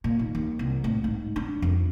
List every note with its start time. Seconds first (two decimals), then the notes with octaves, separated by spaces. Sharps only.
0.04 A#2
0.19 D#3
0.35 D#2
0.59 C2
0.84 A2
1.04 G#2
1.36 D4
1.62 F2